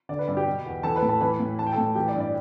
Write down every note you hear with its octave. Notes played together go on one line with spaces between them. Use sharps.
D3 D5
B4
G2 D5
G4 G5
B2
E2
E3 A4 A5
B4 B5
A2
A4 A5
E3 B4 B5
A2
E3 A5
G5
A2 A4 A5
E3 G4 G5
D5
G2
D5